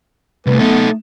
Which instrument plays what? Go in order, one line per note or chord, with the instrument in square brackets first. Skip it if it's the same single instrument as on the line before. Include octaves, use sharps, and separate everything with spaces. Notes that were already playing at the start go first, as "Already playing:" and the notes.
[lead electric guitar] C2 [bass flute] A3 [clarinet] B4
[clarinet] B3 [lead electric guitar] D#4 A4